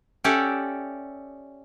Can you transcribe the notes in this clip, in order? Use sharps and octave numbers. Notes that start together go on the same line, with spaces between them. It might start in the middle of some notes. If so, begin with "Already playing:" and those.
C#4 G4 A4 D5 E5 F#5